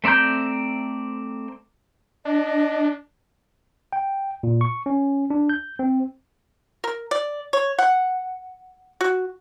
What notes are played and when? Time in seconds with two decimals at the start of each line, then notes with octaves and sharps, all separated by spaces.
0.04 A3 C4 D5 A#5 G6
2.25 D4 D#5
3.93 G5
4.43 A#2
4.61 C#6
4.86 C#4
5.30 D4
5.49 G6
5.79 C4
6.84 A#4
7.11 D5
7.53 C#5
7.79 F#5
9.01 F#4